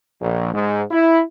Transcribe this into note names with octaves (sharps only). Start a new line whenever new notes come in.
A#1
G#2
E4